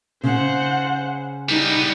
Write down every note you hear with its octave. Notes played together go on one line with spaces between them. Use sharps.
C#3 C5 F#5
G3 B3 D#4